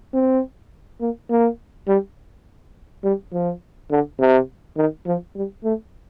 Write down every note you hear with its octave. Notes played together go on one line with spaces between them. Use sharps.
C4
A#3
A#3
G3
G3
F3
D3
C3
D#3
F3
G3
A3